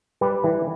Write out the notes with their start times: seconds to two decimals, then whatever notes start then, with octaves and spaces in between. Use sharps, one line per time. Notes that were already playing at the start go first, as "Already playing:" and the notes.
0.21 G3 B4 D5
0.44 E3